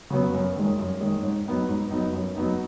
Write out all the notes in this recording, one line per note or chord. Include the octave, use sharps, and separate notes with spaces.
C#3 F#3 B3
F#2
D#3 G#3
F#2
D#3 G#3
G#2
F#3 B3 D#4
G#2
F#3 B3 D#4
F#2
F#3 B3 D#4